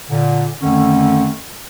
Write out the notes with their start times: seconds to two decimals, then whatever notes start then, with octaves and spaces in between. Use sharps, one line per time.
0.10 A#2 D3
0.62 F2 D3 D#3 A3 C#4